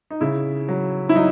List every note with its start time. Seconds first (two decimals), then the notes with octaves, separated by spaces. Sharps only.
0.10 D#4
0.21 C#3 E4
0.68 F#3
1.09 E4
1.15 F#3 D#4